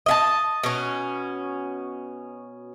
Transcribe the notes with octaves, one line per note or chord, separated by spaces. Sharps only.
D#5 E5 A5
B2 C#4